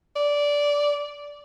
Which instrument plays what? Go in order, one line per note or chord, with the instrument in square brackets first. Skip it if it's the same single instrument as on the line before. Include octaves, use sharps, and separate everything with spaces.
[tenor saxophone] D5